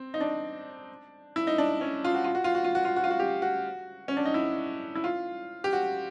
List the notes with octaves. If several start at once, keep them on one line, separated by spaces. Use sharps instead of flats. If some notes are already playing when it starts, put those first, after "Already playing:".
Already playing: C4
D#4
D4
E4
D#4
D4
C#4
F4
F#4
F4
F#4
F4
F#4
F4
F#4
F4
F#4
F4
F#4
G4
F#4
C#4
D4
D#4
E4
E4
F4
G4
F#4